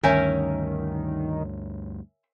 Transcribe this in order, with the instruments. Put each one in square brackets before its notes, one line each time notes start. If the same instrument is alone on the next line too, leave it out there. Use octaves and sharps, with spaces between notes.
[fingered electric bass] D2 G2 [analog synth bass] D#3 [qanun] C#4 A#4 [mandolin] E5 G#5 G6